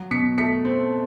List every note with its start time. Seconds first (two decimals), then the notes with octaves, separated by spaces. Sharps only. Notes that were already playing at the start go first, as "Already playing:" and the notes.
Already playing: F#3
0.11 B2 B6 C#7
0.38 A3 B6 C#7
0.65 C4